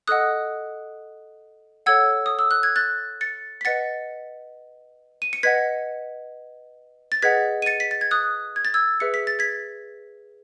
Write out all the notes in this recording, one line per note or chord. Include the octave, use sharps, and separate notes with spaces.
A4 D#5 F#5 D#6 F#6
A4 C#5 F#5 E6 G#6
D#6
E6
F#6
G#6
F#6 A6
A6 C#7
B6
B4 D#5 F#5 A6 C#7
D#7
C#7
B4 D#5 F#5 G#6 B6
A6
G#4 B4 D#5 F#5 G#6 B6
D#7
A6 C#7
B6
A6
G#6
D#6 F#6
G#6
A6
E6 G#6
G#4 B4 E5 C#7
B6
A6
G#6 B6